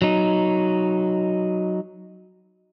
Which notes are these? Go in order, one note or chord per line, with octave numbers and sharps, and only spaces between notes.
F#3 D#4